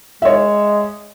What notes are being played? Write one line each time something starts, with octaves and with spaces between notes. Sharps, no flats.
G#3 C#5 E5